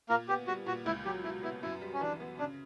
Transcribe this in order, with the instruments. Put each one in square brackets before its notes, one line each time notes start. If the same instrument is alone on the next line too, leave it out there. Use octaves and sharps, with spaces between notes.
[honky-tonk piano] A#2 [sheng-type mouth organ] A#3 A#4
[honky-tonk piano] B3 [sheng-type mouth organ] G4
[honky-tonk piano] G3 [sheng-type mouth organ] F#4
[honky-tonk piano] A#2 [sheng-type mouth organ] F#4
[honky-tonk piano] C#2 [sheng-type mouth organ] E4
[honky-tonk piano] F#3 [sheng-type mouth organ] G4
[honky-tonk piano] B2 [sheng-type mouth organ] E4
[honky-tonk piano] B3 [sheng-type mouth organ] E4
[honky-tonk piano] F#2 [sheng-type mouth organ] E4
[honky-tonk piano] G3
[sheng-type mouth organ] C#4
[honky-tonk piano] E3 [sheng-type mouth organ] D4
[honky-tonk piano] B3
[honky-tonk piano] C#3 [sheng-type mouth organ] D4